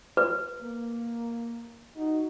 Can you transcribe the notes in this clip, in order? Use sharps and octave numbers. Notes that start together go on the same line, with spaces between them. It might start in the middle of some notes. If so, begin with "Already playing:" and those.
B4
A#3
D#4 F#4